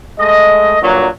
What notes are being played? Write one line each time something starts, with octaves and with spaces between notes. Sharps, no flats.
G#3 A3 D#5
G2 A#2 F#3